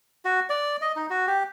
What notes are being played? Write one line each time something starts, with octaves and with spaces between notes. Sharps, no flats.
F#4
D5
D#5
D#4
F#4
G4